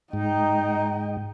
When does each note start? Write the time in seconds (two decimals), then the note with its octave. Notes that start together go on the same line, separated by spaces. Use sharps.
0.13 G#2 D#4 D#5 G5